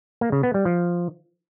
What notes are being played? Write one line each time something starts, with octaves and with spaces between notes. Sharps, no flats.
A#3
C#3
B3
G3
F3